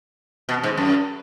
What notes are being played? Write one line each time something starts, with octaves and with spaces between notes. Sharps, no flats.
B2
G#2
F#2